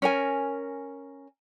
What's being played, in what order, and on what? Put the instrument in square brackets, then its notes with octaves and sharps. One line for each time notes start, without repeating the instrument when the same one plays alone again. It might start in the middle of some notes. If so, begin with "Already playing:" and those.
[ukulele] C#4 A#4 G#5